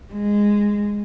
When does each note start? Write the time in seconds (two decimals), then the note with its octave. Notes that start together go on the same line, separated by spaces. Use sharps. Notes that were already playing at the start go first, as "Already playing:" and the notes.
0.13 G#3